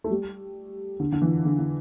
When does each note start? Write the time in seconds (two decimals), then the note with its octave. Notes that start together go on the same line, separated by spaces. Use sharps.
0.04 A3
0.11 G3
1.00 D3
1.12 D3
1.22 E3
1.45 D3
1.59 D3